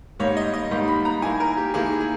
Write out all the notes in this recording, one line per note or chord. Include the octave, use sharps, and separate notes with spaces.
G#2 D#3 G3 A#3 C#5
D#5
D#5
G#2 D#3 G3 A#3
B5
A#5
D#3 A#3 E4 G#5
A#4
G4
D#3 A#3 E4 G#4
G#4